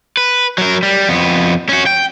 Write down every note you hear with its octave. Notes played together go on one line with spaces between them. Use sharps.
B4
F#3 A#4
G3
F2 B3
C#4 F#4
G5